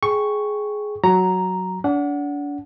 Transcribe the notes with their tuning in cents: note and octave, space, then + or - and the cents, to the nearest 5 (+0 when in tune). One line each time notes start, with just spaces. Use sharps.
G#4 +15 G5 +0 C#6 +0
F#3 +0 A#5 +0
D4 -35 F#5 +0